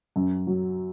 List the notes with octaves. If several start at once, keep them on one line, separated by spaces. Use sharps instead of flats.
F#2
F#3